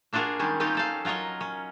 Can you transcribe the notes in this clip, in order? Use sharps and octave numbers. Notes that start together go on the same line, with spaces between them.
A#3 D4 F4 F#4 G#4 A#4
D#3 G3 G#3 C#4
C4 C#4 D#4 F4 G4
C#4 A4 F5
F#3 F4 A#4 C#5 D#5
C#4